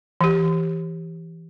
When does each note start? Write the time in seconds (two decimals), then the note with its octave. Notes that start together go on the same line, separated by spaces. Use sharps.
0.21 E3 G4